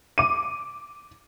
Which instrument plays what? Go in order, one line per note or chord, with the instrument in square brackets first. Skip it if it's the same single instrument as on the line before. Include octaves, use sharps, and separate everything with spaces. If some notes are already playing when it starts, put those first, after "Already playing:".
[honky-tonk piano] D6 D#7